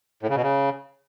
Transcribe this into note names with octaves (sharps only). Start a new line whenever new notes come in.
A2
C#3
B2
C#3